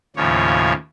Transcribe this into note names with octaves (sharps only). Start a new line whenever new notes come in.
D#2 A2 C#3 F3 C#5